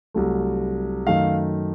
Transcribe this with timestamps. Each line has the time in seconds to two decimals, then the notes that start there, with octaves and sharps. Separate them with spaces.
0.15 C2 C3 F#3 A3
1.07 F#2 D#3 A3 F5